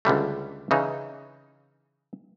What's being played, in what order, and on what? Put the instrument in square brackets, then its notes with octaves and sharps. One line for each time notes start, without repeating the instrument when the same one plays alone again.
[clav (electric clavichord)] C#2 D3 G3 A3
C#3 E3 D#4